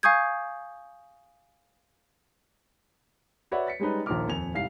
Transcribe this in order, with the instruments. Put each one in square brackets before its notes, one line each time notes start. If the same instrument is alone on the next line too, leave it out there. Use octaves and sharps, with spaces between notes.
[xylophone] F5 G#5 C#6 D#6 G6 G#6
[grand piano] F#4 B4 C#5 D5 E5 F#5
A6 B6 C#7
G3 G#3 C#4 D#4 B4
A#1 D#2 F4 A#4 D6 F6
D#1 F2 G#5 G#6 F7
C2 G#2 G3 F5 C7